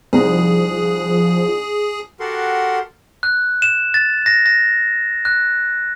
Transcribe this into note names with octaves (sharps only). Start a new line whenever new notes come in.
C2 D#3 F3 G#4 A#5
F#4 G4 A4 A#4 F#5 C6
F#6
E7
A6
A#6
A#6
F#6